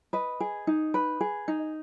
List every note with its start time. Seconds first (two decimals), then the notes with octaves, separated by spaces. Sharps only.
0.13 B4 D#5
0.40 G#4
0.67 D#4
0.94 B4
1.21 G#4
1.48 D#4